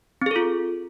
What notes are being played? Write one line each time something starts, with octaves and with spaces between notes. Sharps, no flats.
C4 F4 G#4 A4